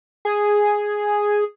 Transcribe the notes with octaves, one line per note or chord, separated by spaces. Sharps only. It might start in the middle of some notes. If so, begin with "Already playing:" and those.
G#4